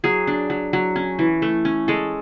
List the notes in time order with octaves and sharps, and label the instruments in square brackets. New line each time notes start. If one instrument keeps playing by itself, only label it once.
[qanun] F#3 G#4
D4
F#3
F#3
C#4
E3
A3
C#4
G#3 A4